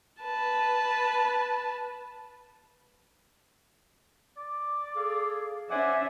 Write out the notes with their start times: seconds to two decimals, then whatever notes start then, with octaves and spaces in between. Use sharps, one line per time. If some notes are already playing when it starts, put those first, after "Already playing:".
0.22 B4 A5
4.37 D5
4.96 G#4 A4 F5
5.70 C#4 C5 D5 E5 F#5 G#5